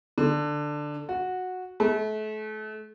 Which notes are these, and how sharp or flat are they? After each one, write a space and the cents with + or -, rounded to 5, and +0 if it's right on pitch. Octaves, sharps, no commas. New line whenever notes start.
D3 +10
F#4 -10
A3 -35